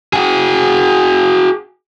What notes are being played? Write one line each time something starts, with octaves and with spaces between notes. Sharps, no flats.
F#4 G#4